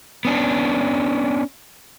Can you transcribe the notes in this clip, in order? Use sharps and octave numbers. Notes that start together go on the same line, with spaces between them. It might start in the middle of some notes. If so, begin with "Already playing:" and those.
B3 C#4 D4